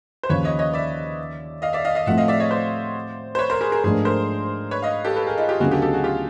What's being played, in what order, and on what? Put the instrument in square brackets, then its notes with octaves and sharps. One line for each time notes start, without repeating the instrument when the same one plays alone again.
[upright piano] C5
[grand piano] D#2 C#3 F3 [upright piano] B4 C#5
[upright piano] C#5 D#5
C#5 D#5
D5 E5
D#5 F5
D5 E5
D#5 F5
D#5 F5
[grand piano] A2 F3 A3 C4 F4 [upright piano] E5 F#5
[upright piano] D#5 F5
D5 E5
C#5 D#5
C5 D5
C5
B4 C#5
A#4 C5
G#4 A#4
G#4 A#4
[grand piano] G#2 F3 A3 D4 [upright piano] G#4 A#4
[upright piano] A#4 C5
B4 C#5
D#5 F5
G4 A4
A4 B4
G#4 A#4
D#4 F4
F4 G4
[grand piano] D2 C#3 F#3 B3 D#4 [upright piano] F#4 G#4
[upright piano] G4 A4
G4 A4
F#4 G#4
F4 G4